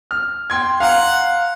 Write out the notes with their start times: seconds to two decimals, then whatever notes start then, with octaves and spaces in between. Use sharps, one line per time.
0.11 F6
0.50 G5 C6 G#6
0.80 F5 F#5 A#5 C6